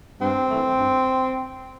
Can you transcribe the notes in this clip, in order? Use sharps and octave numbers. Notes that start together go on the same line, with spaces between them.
G2 C4
E3 A3
G2